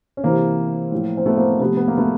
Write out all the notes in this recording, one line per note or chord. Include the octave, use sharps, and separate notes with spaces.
C#4
C3 E3 A#3 C4
A2 F3
C4
A3 B3
A#3 C4
C3 F3 A3 B3
B3
A#3
A3 B3